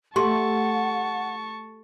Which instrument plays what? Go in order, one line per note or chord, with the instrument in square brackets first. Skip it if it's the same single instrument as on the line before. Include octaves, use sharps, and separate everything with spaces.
[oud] A3 [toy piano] G4 C6 [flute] F#5 [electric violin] A5 C#6